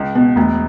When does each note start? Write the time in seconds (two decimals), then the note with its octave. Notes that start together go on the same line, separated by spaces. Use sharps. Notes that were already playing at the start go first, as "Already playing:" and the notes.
Already playing: C#2
0.15 B2 B3
0.36 E1 A3